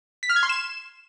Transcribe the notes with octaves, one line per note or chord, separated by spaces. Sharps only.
B6
F6
G#6
C6
E7